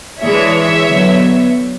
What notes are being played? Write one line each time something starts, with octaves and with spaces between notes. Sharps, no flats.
E3 G#3 D4 C#5 E5
D3 F#3 B3